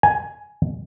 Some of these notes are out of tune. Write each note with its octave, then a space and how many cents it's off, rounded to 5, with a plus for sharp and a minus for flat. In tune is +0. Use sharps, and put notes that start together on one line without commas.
G#5 +10